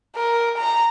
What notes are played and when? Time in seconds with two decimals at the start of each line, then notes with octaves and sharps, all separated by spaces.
0.15 A#4
0.58 A#5